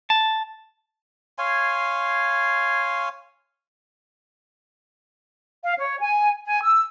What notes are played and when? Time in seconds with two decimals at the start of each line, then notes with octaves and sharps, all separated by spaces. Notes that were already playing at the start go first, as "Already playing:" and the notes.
0.10 A5
1.38 C#5 F5 G#5 C6
5.63 F5
5.77 C#5
5.99 G#5
6.46 G#5
6.63 E6